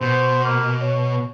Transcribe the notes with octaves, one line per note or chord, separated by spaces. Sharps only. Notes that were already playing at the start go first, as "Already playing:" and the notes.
B2 C5
A#3
C#5